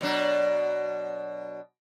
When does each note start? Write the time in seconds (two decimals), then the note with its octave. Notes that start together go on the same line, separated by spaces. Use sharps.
0.01 B2 F#3 D4